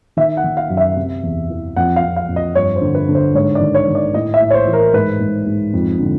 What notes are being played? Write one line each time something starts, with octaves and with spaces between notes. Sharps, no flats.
D#3 E5
F#5
D#3
F5
F#2
E5
C3
E2
E3
F2 F#5
F5
F2
F5
F2
D#5
G2 C#5
C5
D3
B4
D3
C5
G#2 C#5
D5
D#3
C#5
D#3
D5
A2 D#5
E5
A2
C#5
C5
E3
A#4
G#2 B4
G#2
G#2
F2
D3